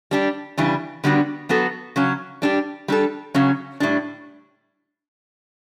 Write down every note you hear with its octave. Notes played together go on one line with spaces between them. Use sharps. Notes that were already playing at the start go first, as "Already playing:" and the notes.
G3 D4 G4
C#3 E3 G3 D4
D3 G3 B3 D4 F#4
F#3 B3 F#4 A4
C#3 F#3 C#4
G3 D4 G4
G3 D4 A4
C#3 F#3 C#4
A2 G3 D4